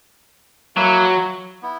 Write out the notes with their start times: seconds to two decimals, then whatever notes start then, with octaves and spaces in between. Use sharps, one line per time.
0.76 F#3 A#3 E4 B4 E5
1.62 B3 E4